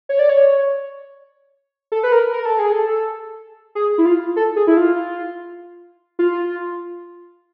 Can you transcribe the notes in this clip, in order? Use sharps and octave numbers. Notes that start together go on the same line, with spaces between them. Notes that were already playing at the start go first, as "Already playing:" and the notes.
C#5
D5
C#5
A4
B4
A#4
A#4
A4
G#4
A4
G#4
E4
F4
A4
G#4
E4
F4
F4